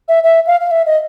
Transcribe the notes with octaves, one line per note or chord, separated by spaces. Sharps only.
E5
E5
F5
F5
E5
D#5